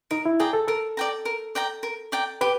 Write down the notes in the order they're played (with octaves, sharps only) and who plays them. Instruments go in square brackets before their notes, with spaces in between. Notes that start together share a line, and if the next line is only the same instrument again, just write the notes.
[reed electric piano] D#4 [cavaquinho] A#4
[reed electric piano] E4
[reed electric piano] G#4 [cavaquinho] D5 G5 A#5
[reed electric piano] A4
[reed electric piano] A4 [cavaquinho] A#4
[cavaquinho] D5 G5 A#5
A#4
D5 G5 A#5
A#4
D5 G5 A#5
[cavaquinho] G4 [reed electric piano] B4